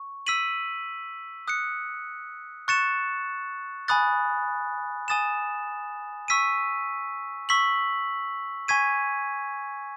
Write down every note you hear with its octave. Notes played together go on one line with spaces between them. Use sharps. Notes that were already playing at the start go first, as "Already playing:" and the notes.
Already playing: C#6
E6 B6 D#7 F#7
D#6 F#6 C#7
C#6 F#6 A6 C#7 E7
G#5 B5 D#6 F#6 A6
G#5 D#6 A6 E7
C#6 E6 B6 D#7
C#6 E6 B6 F#7
G#5 C#6 G#6 B6 D#7